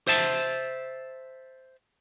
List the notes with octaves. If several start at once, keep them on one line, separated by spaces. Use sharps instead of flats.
C5 E5 A5